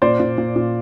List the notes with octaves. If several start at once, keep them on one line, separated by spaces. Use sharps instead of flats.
A#2 C5 D5
A#2
A#2
A#2